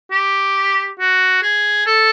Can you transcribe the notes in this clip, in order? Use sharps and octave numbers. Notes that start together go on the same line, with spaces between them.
G4
F#4
G#4
A4